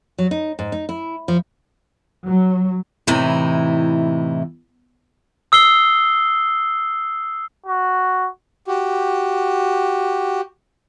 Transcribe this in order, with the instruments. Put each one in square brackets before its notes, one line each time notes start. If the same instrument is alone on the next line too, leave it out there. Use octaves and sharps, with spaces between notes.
[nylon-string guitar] F#3
D#4
G#2
D#4
E4
F3
[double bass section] F#3
[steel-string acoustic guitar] A2 C3 E3 D#4 E4
[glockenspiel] D#6 E6 C7 G7
[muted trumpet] F#4
[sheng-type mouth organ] F#4 G4